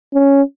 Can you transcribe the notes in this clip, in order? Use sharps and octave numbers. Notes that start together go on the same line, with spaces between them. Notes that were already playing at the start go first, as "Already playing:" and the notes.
C#4